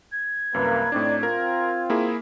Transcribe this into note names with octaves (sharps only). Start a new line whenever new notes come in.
G#6
C2 F#2 A#3 B4
A2 C4 D4 D#4 D5
C4 F4 A#4
A#3 E4 G#4